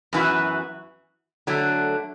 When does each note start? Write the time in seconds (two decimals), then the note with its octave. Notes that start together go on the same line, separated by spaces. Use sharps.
0.13 F#2 E3 B3 F#4
1.47 D3 F#3 A3